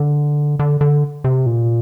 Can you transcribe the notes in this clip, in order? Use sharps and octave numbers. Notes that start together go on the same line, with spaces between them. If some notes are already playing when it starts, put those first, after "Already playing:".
Already playing: D3
D3
D3
C3
A#2